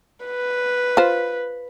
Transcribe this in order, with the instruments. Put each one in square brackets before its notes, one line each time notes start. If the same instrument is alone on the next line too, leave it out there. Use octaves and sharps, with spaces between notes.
[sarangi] B4
[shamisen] F4 C5